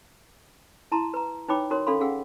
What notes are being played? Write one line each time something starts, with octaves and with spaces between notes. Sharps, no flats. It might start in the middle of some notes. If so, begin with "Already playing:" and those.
E4 A5 A#5 C6
B4 A#5
D#4 B4 C#5 G5 B5 D6
D#4 F#4 A#4 C#5 C6
C#4 D4 A4 F5 B5 C6
C#4 G#4 F5 F#5 E6